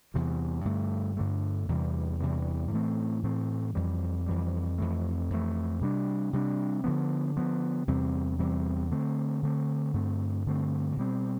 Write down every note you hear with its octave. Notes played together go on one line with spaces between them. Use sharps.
E2 C3 G3
G2 D3 A3
G2 D3 A3
E2 C3 E3 G3
E2 C3 E3 G3
A2 E3 A3 C4
A2 E3 A3 C4
F2 E3 G3
F2 E3 G3
F2 E3 A3
F2 E3 A3
C3 G3 D4
C3 G3 D4
D3 F3 B3
D3 F3 B3
E2 C3 G3 C4
E2 C3 G3 C4
D3 A3 C4
D3 A3 C4
G2 D3 A3 C4
G2 D3 A3 C4
B2 G3 C4